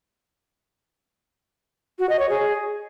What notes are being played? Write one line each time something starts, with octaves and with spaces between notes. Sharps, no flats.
F#4
D#5
C#5
G#4